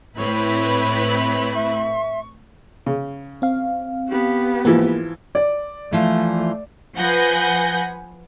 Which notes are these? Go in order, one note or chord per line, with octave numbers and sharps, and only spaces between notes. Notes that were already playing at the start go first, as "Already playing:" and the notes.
A2 C4 E4 B4 C#5 B5
E5 C#6
C#3
C4 F5
B3 G4
G#2 E3 F3 A#3
D5
E3 F3 A3
F3 B4 F#5 G#5 G6 A#6